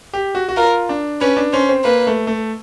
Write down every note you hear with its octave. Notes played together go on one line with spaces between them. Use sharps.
G4
F#4
F#4
F4 A#4
D4
C#4 B4
D4
C#4 C5
C4
A#3 B4
A3
A3